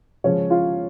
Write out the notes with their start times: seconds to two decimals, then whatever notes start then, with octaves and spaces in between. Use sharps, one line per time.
0.24 C#3 F3 G#3 C#4 C#5
0.50 F4 F5